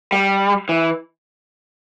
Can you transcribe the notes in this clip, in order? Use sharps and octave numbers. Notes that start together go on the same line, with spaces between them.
G3
E3